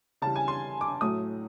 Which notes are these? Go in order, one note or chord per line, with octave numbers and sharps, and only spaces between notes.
C#3 E3 G3 A5
G#5
C6
D6
A2 F#3 A3 D#6